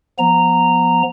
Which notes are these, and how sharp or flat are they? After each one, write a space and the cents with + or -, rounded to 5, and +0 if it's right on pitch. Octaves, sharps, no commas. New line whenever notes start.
F3 +0 B3 -25 A#5 -10